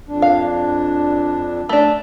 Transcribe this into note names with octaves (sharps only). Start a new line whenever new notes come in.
F2 D4
F5
A3 D4